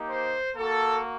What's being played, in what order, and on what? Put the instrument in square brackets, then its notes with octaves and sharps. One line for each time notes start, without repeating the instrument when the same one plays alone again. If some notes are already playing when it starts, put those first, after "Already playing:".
Already playing: [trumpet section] A#3 D#4 G4
C5
A#3 F#4 A4